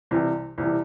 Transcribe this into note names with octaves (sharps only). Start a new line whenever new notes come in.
C2 C3 E3
C2 C3 E3